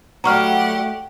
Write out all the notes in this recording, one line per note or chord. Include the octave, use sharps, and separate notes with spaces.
F#3 G3 A3 G4 F#5 A#5 C#6 F6